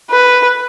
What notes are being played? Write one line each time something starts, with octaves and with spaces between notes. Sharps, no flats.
B4